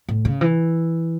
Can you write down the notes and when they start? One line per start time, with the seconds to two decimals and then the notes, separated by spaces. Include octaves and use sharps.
0.09 A2
0.25 C#3
0.41 E3